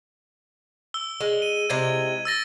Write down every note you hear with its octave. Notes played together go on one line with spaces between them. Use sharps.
E6 G7
G#3
D#7
C3 G#3 E4 G#6
E6 A6 A#6